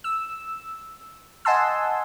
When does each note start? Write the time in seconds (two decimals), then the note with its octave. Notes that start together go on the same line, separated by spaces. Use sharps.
0.04 E6
1.45 D#5 F#5 G#5 A5 C6 E6